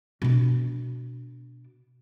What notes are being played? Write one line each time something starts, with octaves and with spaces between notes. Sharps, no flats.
B2 D4